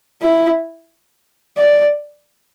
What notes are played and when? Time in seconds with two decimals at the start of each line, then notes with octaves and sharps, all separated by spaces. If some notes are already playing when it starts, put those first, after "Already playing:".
0.21 E4
1.57 D5